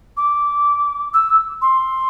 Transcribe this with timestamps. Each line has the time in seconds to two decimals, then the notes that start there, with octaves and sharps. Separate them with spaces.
0.17 D6
1.14 E6
1.62 C6